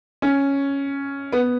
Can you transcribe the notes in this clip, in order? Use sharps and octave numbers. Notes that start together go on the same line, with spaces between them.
C#4
B3